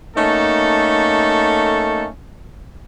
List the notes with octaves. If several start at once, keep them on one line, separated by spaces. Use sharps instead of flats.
A3 A#3 C#4 D#4 A4